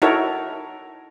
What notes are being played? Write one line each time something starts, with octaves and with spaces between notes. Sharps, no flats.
D#4 E4 F#4 A4 A#4 C#5